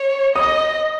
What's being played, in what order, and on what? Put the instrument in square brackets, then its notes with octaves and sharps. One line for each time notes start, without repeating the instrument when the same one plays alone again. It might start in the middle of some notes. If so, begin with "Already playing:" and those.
Already playing: [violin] C#5
[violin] D#5 [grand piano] D#6